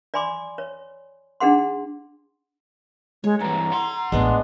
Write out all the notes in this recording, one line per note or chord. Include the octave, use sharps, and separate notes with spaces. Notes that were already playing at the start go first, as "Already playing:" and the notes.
D5 G#5 B5 C6 D6
C#5
D4 D#4 G#4 F#5 C6
G#3 C#5
G2 E3 A#5
F#5 C6
A1 G#3 B3 D4